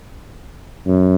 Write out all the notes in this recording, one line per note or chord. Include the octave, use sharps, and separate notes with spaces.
F#2